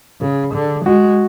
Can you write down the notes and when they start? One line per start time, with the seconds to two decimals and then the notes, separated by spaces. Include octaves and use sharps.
0.21 C#3 G#4
0.54 D3
0.85 G#3 F#4